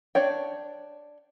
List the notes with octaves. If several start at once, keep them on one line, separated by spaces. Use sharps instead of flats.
D4 C#5 G5